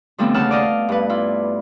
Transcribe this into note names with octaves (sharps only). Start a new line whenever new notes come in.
D3 F3 G3 A3 B3 C4
D#2 C#3 F#5 A5 E6 F6
D5 D#5 F5
G2 B4
E4 F4